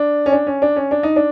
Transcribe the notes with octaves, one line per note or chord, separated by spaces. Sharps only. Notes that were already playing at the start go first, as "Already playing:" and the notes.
Already playing: D4
C#4
D4
C#4
D4
C#4
D4
D#4
D4